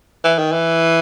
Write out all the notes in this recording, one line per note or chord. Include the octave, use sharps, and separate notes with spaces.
E3
D#3
E3